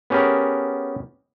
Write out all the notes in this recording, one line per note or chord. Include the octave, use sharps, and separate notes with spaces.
B3 C#4 G4 G#4 A#4